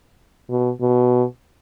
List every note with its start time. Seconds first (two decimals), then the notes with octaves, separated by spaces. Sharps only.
0.50 B2
0.81 B2